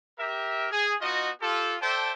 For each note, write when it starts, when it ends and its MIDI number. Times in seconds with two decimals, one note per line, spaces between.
0.18 0.67 67
0.18 0.67 70
0.18 0.67 76
0.70 0.94 68
1.01 1.30 59
1.01 1.30 63
1.01 1.30 65
1.01 1.30 66
1.01 1.30 75
1.41 1.76 65
1.41 1.76 67
1.41 1.76 69
1.81 2.11 69
1.81 2.11 72
1.81 2.11 74
1.81 2.11 76
1.81 2.11 79
1.81 2.11 81